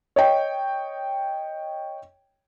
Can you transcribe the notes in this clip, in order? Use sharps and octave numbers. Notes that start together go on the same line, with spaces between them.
C#5 D#5 G5